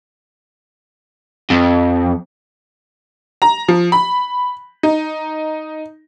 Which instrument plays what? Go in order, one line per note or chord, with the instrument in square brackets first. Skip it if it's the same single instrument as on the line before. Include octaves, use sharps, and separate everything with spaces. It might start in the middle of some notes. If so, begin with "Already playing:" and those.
[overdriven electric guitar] F2
[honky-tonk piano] A#5
F3
B5
D#4